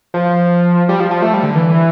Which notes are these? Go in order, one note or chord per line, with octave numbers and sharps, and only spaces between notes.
F3
G3
F3
F3
A3
G3
D3
E3